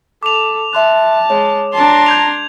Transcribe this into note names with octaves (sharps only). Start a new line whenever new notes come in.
A4 D6 F7
E5 A5 C6 F#6
G#3 C#5
D4 A5 A#5 C6
G6 G#6 F7